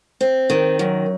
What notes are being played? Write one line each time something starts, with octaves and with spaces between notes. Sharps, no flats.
C4
D#3
F#2